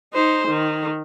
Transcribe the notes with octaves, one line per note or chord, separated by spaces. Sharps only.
D#4 C5
D#3